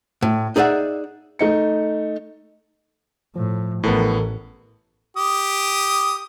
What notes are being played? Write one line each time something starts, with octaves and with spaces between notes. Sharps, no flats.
A2
D#4 G#4 D5 E5 F#5
A3 D#4 C#7
A2 F3 A3
A1 A2 E3 B3 A4 A#4
G4 D#6